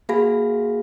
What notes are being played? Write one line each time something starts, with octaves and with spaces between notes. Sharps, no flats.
A#3 F#4 G#4 F5 B5 A#6